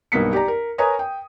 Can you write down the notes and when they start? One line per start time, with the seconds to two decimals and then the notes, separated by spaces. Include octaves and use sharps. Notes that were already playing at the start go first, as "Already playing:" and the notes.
0.12 B1 G2 A#3 B3 B6 C#7
0.33 G4 D5 A#5
0.48 A#4
0.78 A#4 B4 C#5 G#5 A#5 D#6
0.99 G5